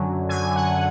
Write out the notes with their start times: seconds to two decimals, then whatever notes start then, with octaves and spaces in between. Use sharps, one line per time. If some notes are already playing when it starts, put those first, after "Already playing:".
Already playing: F#2 D3 F#3
0.29 F#2 D3 F#3 G#5
0.56 F#5